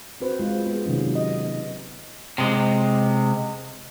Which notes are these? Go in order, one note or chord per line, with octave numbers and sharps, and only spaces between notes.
C4 F#4 B4 C5
G#3 F4
B3 G#4
C3 D#3 F#3 C#4
D#5
B3
C3 G#3